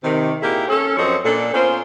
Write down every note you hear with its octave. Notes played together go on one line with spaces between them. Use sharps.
C3 D#3
A#2 A#3 E4 G4 G#4 A#4
C#4 A4
F#2 F3 C4 A4 C#5 D#5
A#2 D4 A4
B3 C#4 F4 A#4 C5